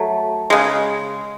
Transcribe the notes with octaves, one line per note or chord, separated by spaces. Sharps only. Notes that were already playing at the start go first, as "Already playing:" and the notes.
Already playing: F#3 A3
C#3 G#3